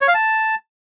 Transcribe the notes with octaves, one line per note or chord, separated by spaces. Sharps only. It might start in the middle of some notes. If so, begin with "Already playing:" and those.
C#5
F5
A5